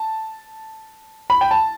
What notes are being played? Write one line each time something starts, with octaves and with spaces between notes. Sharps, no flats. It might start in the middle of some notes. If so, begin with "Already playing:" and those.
Already playing: A5
B5
G5
A5